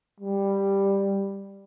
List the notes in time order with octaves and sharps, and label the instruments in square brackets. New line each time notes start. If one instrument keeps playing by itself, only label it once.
[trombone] G3